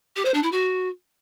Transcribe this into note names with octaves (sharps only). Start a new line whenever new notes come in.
G4
C5
D4
E4
F#4